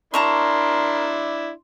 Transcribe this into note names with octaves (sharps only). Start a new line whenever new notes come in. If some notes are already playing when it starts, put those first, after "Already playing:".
D4 E4 A#4 A5 A#5 C6 C#6